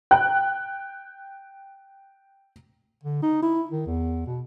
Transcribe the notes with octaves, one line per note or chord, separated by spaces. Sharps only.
G5 F#6
D3
D#4
E4
D#3
E2
B2